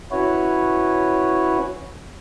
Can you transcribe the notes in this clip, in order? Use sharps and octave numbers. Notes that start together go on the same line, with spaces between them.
C#4 E4 F#4 B4 C#5